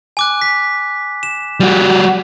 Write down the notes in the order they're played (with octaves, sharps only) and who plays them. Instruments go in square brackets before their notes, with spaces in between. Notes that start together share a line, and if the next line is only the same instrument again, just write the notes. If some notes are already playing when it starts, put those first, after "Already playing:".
[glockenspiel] G#5 D6 F#6
B6
E7
[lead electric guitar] G3 F#4